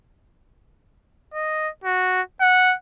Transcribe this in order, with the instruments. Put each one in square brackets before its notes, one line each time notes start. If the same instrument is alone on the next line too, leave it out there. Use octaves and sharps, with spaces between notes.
[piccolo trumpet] D#5
F#4
F#5